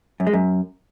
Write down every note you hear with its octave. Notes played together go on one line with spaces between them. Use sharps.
F#2
G#3
F#2